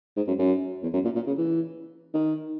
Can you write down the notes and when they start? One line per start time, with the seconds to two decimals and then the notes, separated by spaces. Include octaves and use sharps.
0.17 G#2
0.27 F#2
0.39 F#2
0.83 E2
0.93 F#2
1.05 A#2
1.15 A#2
1.27 C#3
1.38 E3
2.14 D#3